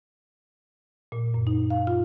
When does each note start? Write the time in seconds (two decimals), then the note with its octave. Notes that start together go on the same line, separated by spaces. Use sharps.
1.12 A#2
1.34 F#2
1.47 D#4
1.70 F5
1.87 F4